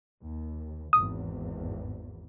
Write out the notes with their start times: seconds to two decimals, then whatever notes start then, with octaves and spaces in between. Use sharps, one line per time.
0.22 D#2
0.93 G#1 E2 D#6